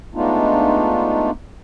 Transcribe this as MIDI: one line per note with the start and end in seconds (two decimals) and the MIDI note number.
0.14 1.31 56
0.14 1.31 57
0.14 1.31 59
0.14 1.31 62
0.14 1.31 63
0.14 1.31 65